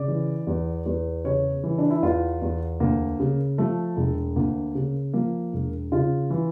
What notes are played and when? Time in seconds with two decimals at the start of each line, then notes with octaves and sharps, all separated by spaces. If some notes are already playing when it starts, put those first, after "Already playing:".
Already playing: C#3 D5
0.08 E3
0.47 E2
0.86 E2
1.24 C#3 C#5
1.64 E3
1.78 D4
1.90 E4
2.03 E2 F4
2.42 E2
2.80 D2 A#3
3.20 C#3
3.58 F3 A3
3.97 E1
4.36 D2 A#3
4.75 C#3
5.13 F3 A#3
5.53 E1
5.92 C#3 F4
6.30 E3